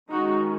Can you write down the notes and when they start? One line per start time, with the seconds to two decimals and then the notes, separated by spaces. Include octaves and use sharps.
0.10 D#3 G#3 C#4 D#4 F#4